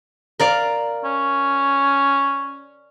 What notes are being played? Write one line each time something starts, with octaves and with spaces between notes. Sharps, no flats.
A#4 D5 F5
C#4